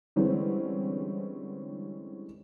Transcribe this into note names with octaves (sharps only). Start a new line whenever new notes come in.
D3 E3 G3 G#3 C4 C#4